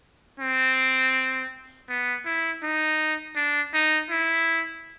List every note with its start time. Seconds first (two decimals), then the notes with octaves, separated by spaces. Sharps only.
0.40 C4
1.89 B3
2.26 E4
2.63 D#4
3.36 D4
3.74 D#4
4.10 E4